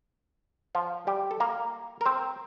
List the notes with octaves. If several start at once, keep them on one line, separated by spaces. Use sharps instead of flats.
F3 F4
G3 G4
A4
A#3 A#4
A#4
C4 C5